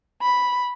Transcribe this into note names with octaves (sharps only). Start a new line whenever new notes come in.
B5